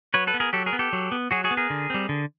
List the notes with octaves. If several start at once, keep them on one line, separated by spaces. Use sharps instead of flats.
F#3 B4 C#5
A4 B4
B3
G#4 A#4
F#3 G4 A4
G#4 A#4
B3
G4 A4
F#3
B3
F#3 F#4 G#4
F#4 G#4
B3
G#4 A#4
D3
G3 C4
D3